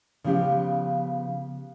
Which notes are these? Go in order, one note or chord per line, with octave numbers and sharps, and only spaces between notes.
C#3 F3 B3 G4 F5